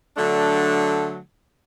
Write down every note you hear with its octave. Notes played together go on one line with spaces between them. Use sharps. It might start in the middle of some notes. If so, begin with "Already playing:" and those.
D3 F#3 A3 D4